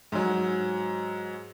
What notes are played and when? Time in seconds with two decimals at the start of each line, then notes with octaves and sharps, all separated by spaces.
0.12 G#2 F#3